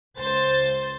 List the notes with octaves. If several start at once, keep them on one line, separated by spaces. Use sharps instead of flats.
C#2 C5 A6